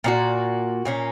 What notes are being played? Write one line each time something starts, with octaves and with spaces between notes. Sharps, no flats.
A#2 A#3 D#4 F#4
A#2 A#3 C#4